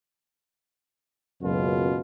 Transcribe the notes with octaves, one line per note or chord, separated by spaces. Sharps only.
F#1 C#2 F#2 B2 F4